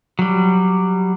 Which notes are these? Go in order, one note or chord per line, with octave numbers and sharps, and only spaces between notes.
F#3 G3